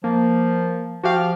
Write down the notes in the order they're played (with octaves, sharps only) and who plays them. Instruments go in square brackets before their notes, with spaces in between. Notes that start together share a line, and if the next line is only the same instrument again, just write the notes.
[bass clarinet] F3 [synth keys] A#3
[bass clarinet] F3 [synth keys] F#4 G4 F5